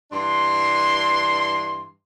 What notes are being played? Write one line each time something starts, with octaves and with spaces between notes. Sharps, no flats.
G2 E3 D4 C6